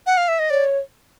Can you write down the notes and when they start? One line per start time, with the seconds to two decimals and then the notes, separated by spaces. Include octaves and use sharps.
0.06 F#5
0.17 F5
0.28 E5
0.39 D#5
0.50 C#5 D5